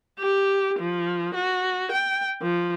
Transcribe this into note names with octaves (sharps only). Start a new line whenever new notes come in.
G4
F3
F#4
G5
F3